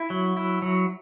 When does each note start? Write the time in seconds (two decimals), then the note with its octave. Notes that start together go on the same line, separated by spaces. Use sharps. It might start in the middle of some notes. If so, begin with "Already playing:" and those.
Already playing: E4
0.10 F#3
0.37 E4
0.62 F#3